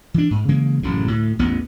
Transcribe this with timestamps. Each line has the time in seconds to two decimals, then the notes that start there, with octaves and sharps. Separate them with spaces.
0.14 E3 D4
0.31 G#2
0.48 C#3 E3 G#3 A#3
0.83 A1 F#2 A2 C#3
1.08 D2 A2
1.39 A1 E2 B3